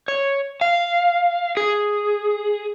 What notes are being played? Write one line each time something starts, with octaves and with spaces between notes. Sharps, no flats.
C#5
F5
G#4